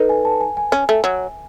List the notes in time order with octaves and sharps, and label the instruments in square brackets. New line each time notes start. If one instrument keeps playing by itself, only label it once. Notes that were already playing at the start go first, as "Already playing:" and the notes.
Already playing: [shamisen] D#4 [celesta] A4 B4
[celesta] G#5
A5
G#5
G#5
[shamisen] C#4
A3
F#3